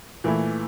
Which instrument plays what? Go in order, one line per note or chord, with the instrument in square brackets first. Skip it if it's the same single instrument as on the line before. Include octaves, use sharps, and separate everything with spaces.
[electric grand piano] A#2 A3 E4 [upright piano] E3